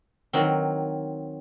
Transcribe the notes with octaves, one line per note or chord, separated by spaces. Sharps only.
D#3 F#3 C4